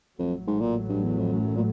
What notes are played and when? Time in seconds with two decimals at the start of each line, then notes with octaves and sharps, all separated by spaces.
0.18 A1 F2 A2 F#3 A3
0.47 G#2
0.61 A#2
0.90 G2
1.04 E2
1.19 F2
1.33 F#2
1.56 A#2